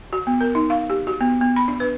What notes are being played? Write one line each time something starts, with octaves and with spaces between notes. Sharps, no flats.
F#4
B3
A#4
D#4
F5
G4
F#4
B3
B3
B5
D4
B4